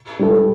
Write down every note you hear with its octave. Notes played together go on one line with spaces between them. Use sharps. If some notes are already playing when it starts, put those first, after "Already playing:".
G3 E4 A4